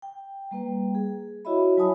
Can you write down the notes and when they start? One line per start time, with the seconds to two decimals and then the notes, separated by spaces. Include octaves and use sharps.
0.02 G5
0.51 G3 A#3 B4 G5
0.95 G#4
1.45 E4 F#4 C#5 D#5 E5 B5
1.77 F#3 E4 C#5 G#5 A5 D#6